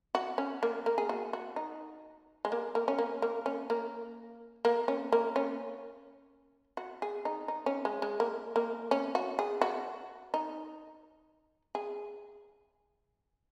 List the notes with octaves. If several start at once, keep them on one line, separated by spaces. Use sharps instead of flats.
F#4
C#4
A#3
A#3
G#4
F#4
F#4
D#4
G#3
A#3
A#3
C#4
A#3
A#3
C#4
A#3
A#3
C#4
A#3
C#4
F#4
G#4
D#4
D#4
C#4
G#3
G#3
A#3
A#3
C#4
F#4
G#4
F#4
D#4
G#4